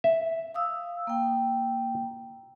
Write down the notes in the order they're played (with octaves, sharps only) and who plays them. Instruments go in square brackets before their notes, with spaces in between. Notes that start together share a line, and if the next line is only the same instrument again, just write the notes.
[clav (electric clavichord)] E5
[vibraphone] F5 D#6 E6
A#3 G5